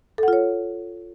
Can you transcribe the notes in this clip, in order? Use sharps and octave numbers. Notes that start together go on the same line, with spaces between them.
F4 A4 C#5 F#5